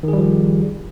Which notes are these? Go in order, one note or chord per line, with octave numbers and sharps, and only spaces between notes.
D#3 F3 G3 G#4